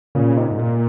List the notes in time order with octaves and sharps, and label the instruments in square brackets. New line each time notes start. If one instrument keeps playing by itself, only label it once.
[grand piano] A#2 [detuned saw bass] C#3
[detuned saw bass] C3 [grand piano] D#4
[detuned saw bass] G#2
[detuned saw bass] A#2 [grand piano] A#3